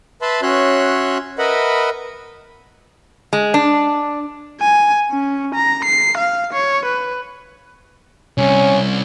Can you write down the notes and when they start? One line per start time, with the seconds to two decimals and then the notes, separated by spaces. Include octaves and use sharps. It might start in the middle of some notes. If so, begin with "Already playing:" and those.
0.22 B4 E5 A5 B5 C6
0.42 C#4 F#4 C#5 E5 C6 F#6
1.38 A#4 B4 D#5 E5 F#5 B5
3.33 G#3
3.54 D4
4.60 G#5
5.11 C#4
5.55 A#5
5.85 C7
6.18 F5
6.53 C#5
6.85 B4
8.38 C2 C#4